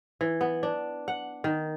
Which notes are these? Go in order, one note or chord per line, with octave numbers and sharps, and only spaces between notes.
E3
B3
D4
F#5
D#3